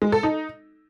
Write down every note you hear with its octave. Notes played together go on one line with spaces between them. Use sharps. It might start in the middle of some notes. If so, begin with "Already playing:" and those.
G#3
A4
D#4